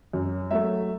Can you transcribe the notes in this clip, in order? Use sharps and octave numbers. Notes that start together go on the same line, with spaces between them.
F#2
F#3 A3 E5